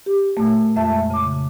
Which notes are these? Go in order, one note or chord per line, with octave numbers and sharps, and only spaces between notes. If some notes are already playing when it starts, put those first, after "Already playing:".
G4
A#2 A3
F2 G#3 E5 A5
C#3 D6